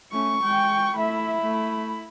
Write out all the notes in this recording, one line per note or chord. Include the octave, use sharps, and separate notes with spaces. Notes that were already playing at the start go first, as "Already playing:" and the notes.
A3 C#4 C#6
G#3 G5
A3 E4 E5 B5
A3